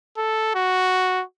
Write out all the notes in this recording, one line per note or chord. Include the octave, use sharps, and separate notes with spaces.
A4
F#4